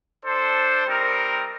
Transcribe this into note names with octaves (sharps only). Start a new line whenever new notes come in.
D4 A4 C5
G3 C4 D#4 A#4